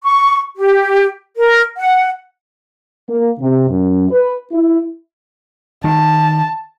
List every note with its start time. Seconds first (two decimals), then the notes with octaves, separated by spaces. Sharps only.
0.04 C#6
0.55 G4
1.37 A#4
1.76 F#5
3.08 A#3
3.40 C3
3.69 F#2
4.10 B4
4.52 E4
5.84 D#3 A5